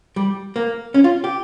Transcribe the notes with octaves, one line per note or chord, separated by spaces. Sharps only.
G3
A#3
C#4
F4
G4